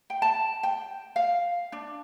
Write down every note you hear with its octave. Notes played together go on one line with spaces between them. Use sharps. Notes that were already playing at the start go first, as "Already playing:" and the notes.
G5
A5
G5
F5
D4